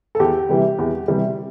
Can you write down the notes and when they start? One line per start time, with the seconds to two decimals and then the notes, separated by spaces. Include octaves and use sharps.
0.15 A4
0.19 E2 G4
0.49 C3 E3 G3
0.79 E2
1.08 C3 E3 G3